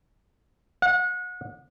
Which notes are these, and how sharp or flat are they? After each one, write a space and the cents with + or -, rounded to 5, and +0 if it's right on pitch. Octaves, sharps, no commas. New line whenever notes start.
F#5 -30